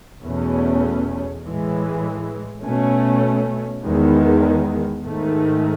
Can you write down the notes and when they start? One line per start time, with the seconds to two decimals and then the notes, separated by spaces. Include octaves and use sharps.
0.23 E2 B2 A3 C#4
1.44 A2 E3 G#3
2.63 B2 A3 C#4
3.83 E2 D#3 G#3 B3
5.03 G#2 D#3 A3